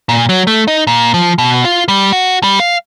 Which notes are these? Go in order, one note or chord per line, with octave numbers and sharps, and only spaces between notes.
A#2
F#3
A3
D#4
A#2
F3
B2
F4
G3
F#4
G3
F5